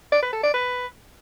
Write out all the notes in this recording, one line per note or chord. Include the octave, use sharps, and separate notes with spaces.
D5
B4
A4
D5
B4